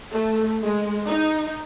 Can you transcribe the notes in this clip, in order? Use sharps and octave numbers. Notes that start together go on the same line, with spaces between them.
A3
G#3
D#4